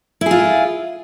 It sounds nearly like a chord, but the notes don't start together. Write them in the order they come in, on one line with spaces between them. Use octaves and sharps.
E4 G#4 F4